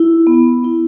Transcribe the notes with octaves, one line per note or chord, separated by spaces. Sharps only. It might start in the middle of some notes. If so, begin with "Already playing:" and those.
Already playing: E4
B3
E4